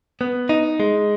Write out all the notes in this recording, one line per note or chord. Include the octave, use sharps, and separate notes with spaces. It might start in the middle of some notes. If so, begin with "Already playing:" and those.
B3
D#4
G#3